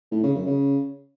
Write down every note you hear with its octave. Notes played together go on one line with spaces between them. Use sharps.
A2
C#3
F#2
C#3